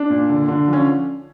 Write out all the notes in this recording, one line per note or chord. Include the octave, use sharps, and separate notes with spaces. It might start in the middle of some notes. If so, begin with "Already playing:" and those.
Already playing: D4
A#2
D3
D3
F3
C#4